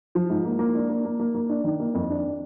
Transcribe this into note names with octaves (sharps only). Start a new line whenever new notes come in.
F3
G#2
A#3
A#3
D4
A#3
A#3
A#3
A#3
D4
D#3
A#3
F2
D4